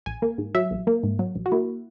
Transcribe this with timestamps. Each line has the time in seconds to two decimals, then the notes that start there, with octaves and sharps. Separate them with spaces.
0.06 A#1 G#5
0.22 A#3
0.38 G#2
0.55 F#3 E5
0.71 A#1
0.87 A#3
1.03 G#2
1.19 F#3
1.35 A#1
1.46 F#4
1.52 A#3 E4